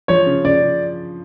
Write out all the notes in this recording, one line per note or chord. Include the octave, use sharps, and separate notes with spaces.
F3 C#5
C#3
C#3 D5
C#3